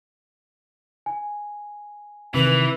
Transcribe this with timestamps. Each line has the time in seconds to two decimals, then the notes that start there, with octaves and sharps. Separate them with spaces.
1.06 G#5
2.34 C3 D#3 E3 B4